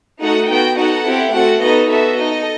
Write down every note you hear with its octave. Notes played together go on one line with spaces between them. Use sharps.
A3 D#4 F#4 A4 F#5
B3 F#4 A4 G5
D#4 F#4 A4 F#5
C4 E4 G4
A3 C4 F#4 A4 F#5
B3 D#4 F#4 A4 D#5
B3 F#4 A4 E5
D#4 A4 D#5